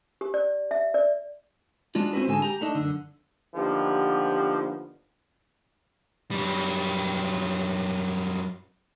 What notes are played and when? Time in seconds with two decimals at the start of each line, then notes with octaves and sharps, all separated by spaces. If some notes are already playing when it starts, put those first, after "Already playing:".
0.21 G4
0.34 D5
0.71 E5
0.94 D5
1.95 G#3 D4 F4 F#4
2.13 C4 C#4 E4 F#4 B4
2.27 G#2 D3 G#3 A4 G#5
2.42 G4 A#5
2.61 A3 D4 D#4
2.75 F#2 B2 D3
3.55 D#2 D3 F3 B3 G4
6.31 F#2 G3